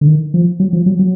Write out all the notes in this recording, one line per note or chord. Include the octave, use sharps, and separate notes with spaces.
D3
D#3
F3
F#3
F3
F#3
F#3